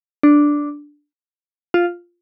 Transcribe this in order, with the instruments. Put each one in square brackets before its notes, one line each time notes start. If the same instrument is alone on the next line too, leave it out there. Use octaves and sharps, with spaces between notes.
[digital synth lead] D4
F4